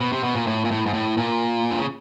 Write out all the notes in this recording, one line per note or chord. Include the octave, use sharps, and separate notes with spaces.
B2
C3
B2
A#2
A2
A#2
A2
G#2
A2
A#2
D3
C#3